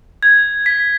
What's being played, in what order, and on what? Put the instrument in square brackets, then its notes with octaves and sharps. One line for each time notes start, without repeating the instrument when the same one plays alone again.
[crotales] G#6
B6